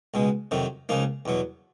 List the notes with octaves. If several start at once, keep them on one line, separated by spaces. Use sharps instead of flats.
C#2 B2 G#3
F2 C3 D#3 F#3
C#2 C#3 F3 A#3 D#4
E2 B2 F#3